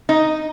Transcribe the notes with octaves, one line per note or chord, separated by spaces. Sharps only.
D#4